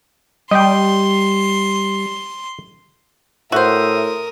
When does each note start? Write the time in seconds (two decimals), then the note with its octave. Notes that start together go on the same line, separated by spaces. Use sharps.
0.51 G3 D#5 G5 C6
3.52 A2 F#4 A#4 C5 E5 D#6